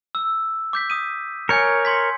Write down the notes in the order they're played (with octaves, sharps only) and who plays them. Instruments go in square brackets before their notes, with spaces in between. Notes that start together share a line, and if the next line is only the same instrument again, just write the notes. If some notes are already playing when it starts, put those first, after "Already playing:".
[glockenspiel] E6
D6 G6 B6
D#6 D#7
[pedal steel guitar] A#4 C#5 [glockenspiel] G#5 G6 C#7
[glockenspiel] C6 G#6 B6